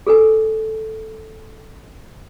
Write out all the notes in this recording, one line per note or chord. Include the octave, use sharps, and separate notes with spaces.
G#4 A4 B4 G#5